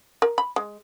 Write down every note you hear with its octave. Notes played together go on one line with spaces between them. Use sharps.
A#4
B5
G#3